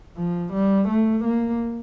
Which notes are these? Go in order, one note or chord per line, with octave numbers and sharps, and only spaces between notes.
F3
G3
A3
A#3